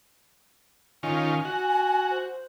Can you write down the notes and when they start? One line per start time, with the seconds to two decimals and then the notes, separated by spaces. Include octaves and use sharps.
1.03 D#3 C#4 F4 G#5
1.45 F#4
2.11 C5